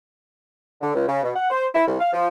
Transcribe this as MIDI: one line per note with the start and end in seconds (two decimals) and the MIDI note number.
0.81 0.92 50
0.94 1.07 37
1.07 1.22 49
1.23 1.32 47
1.36 1.49 78
1.51 1.66 72
1.73 1.84 64
1.87 1.98 36
2.00 2.08 77
2.13 2.28 53